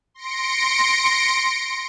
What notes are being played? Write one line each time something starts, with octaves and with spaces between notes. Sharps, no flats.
C6 A#6 C#7 D7